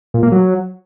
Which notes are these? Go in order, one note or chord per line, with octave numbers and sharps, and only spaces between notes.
A#2
A#3
F#3